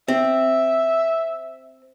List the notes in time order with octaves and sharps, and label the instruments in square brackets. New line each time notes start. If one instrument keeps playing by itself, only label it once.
[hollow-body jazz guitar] C4 [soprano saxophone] E5